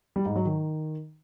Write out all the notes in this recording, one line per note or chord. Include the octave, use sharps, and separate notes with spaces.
G3
G#2
F#3
D#3